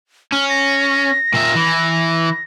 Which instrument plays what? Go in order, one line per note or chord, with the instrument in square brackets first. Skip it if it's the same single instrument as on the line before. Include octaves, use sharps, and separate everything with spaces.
[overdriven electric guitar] C#4 [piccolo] F6
[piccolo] A#6
[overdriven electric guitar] A#2 E5
E3